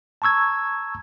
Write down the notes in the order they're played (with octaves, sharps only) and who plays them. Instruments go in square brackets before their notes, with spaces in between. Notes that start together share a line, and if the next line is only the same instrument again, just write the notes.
[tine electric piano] A5 A#5 C#6 E6 G#6